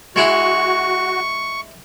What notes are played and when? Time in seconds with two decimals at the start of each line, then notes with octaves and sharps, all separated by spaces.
0.16 G#3 E4 F#4 G#4 C#6